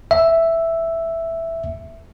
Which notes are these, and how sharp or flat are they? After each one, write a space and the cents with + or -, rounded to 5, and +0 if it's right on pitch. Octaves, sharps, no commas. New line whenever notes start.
E5 +0